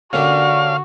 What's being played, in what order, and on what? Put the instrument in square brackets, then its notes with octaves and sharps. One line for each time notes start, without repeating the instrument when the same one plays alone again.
[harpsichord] D3 A#3 G4 [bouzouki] C#4 D4 [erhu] F#4 [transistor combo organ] F5